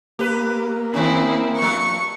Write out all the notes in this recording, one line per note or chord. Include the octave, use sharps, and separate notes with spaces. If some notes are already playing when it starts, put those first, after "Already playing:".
A#3 G4 B4
D#3 C4 C#4 E4 G#4
G2 F3 C#6